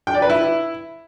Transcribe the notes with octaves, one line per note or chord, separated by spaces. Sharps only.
G5
D5
B4
E4